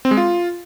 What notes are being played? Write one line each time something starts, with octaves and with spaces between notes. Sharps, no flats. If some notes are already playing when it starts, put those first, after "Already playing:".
C4
G#3
F4